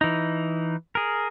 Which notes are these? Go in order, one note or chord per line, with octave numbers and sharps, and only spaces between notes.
E3 D#4
G#4 A#4